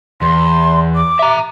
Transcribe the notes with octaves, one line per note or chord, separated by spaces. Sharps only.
E2 C6
D6
E5 A#5